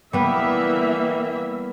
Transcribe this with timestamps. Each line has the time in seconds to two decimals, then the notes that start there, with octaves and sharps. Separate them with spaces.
0.13 E3 G3 A#3 B3 E5